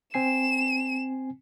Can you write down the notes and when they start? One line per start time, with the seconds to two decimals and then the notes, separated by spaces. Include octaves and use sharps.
0.14 C4 G#5 C7 E7